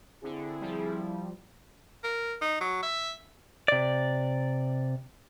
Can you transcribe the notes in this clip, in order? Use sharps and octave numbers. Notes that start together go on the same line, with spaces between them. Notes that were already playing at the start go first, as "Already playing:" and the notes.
D3 C4 E4 G#4
F3 G3
A#4
D#4
F#3
E5
C3 D5